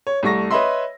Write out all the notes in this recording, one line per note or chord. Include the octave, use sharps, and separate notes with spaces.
C#5
C2 A3 C#6 A#6
B4 C#5 D#5 E5 B5 C6